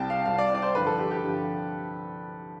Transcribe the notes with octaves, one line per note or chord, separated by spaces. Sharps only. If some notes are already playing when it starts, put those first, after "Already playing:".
Already playing: C2 C3 G3 G5 A5
F5
C2 C3 G3 F5
D5
D5
C5
G2 D3 F3 B4
A4
G4
G4
G2 D3 F3